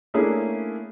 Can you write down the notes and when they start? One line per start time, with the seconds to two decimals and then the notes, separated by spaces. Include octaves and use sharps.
0.14 A3 A#3 C#4 D4 E4 G#4